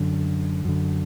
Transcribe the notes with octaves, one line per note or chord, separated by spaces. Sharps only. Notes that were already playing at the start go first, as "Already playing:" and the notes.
Already playing: F#2 D3
F#2 D3